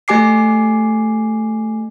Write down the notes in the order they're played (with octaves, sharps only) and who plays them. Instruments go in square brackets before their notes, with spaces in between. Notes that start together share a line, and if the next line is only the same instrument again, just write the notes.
[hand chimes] A3 G4 G#5 D6 C7